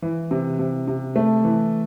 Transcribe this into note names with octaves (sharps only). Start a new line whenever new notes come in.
E3
C3
C3
C3
A3
E3